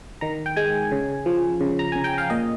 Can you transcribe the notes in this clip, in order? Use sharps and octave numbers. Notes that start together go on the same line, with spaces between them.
D#3 A#5
G5
G#3 G#5
C#3
F3
C#3
A#5
C#3 G#5
G5
F5
A#2 D#5